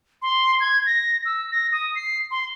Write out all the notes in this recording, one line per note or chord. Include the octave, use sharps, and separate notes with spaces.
C6
G#6
A#6
E6
A#6
D#6
C7
C6